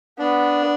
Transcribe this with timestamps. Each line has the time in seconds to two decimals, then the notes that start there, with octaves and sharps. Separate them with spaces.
0.19 B3 D4